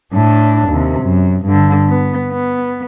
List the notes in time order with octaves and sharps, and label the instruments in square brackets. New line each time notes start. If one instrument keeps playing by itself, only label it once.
[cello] A2 D4
D#2 C3
F#2
G2 D3
B3
B3